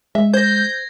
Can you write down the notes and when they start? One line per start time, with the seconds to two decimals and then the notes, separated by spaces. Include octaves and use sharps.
0.15 G#3 E5
0.34 C5 G6 G#6 A#6